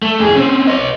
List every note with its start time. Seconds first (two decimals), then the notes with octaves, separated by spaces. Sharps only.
0.02 A3
0.19 F2 G#4
0.35 C4 C#4
0.67 C#5 D#5